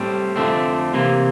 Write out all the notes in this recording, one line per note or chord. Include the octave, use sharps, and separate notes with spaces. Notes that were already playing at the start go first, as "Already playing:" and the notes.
Already playing: A2 G3 C4
F2 D3 A3 C4
C3 E3 A#3